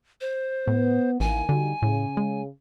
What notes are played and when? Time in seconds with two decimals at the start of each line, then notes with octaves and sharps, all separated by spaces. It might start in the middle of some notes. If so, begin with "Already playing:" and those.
0.21 C5
0.67 A2 B3
1.20 A1 D#3 E3 A#3 G#5
1.49 D3 G3 D#4 F#4
1.82 A2 C#3
2.17 G#3